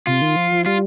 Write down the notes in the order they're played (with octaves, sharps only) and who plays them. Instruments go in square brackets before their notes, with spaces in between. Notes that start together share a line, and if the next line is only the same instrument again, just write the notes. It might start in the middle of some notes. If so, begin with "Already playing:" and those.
[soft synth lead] C3 [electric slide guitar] F4
[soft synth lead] D#3
F3
F3
[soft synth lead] G3 [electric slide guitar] F4